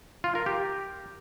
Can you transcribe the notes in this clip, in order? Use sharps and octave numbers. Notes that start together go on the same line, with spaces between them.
F4
A#4
G4